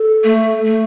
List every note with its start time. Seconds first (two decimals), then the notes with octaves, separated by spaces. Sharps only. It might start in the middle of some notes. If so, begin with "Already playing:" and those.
Already playing: A4
0.24 A3
0.66 A3